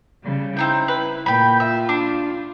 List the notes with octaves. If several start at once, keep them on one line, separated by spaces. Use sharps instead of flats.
C#3 G3
C4 D#4 E4 G5
B4
A#2 G5 B5
F4 E5
D4